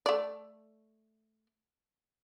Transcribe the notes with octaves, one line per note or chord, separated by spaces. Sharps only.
A3 D5